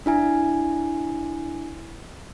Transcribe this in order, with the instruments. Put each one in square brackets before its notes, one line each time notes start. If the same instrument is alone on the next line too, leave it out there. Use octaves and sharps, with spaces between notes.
[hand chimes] D4 E4 G#5